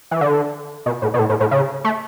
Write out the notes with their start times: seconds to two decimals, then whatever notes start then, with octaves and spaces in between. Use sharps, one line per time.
0.11 E3
0.21 D3
0.86 B2
1.02 A2
1.14 B2
1.19 A2
1.29 A2
1.40 A2
1.51 C#3
1.84 A3